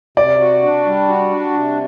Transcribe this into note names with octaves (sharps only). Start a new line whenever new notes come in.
C3 D5
F#4
D4
G3
F#4
D4
C3